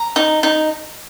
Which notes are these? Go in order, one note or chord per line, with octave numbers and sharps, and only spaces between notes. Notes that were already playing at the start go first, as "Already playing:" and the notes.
Already playing: A#5
D#4
D#4